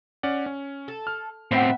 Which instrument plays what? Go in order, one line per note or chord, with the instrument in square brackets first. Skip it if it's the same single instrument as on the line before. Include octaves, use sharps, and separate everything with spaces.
[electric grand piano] C#4 D5 F#5
C#4
[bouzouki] A4
[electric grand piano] F6
[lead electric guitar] A2 C4 [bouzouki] B3 E5 G5